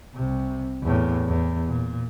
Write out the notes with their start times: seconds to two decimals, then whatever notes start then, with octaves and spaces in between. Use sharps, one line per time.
0.15 C2 C3
0.83 E2 A2
1.27 E2
1.68 A#2